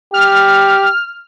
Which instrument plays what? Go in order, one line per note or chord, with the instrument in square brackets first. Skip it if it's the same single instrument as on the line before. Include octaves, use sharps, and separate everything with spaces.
[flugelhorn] G4 [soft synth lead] F6